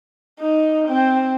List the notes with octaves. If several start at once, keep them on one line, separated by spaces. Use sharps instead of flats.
D#4
C4